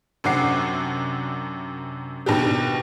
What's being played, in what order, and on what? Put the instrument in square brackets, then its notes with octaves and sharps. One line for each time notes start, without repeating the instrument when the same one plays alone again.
[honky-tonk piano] F#2 C3 D4 F#5 D6 C7
F#1 B2 D#3 D4 G4